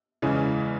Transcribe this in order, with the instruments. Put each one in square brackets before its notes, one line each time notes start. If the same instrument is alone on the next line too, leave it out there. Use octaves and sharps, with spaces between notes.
[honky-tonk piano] E2 C#3 E3 G#3 C#4